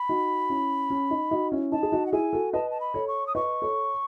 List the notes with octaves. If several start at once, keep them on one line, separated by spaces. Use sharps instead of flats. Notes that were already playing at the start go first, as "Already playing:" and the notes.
Already playing: B5
D#4 F#4
C#4 E4
C#4
D#4
D#4 F#4
C#4 E4
D#4 A5
G#4
D#4 F#4
F#5
E4 G#4 G#5
F#4 A4
B4 D#5 A5
A5
B5
A4 C#5
C#6
D#6
B4 D#5 C#6
A4 C#5